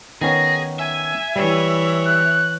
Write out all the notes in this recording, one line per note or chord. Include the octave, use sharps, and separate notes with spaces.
D#3 B3 C#4 G#4 A#6
E5 G#5
E3 G3 C#5
F#6